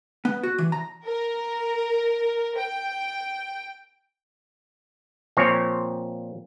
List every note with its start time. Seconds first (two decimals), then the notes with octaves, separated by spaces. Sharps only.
0.25 B3
0.43 F#4
0.58 E3
0.72 A#5
1.07 A#4
2.57 G5
5.37 A#2 F3 C4 C#5